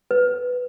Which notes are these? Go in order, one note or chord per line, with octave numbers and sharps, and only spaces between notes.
B4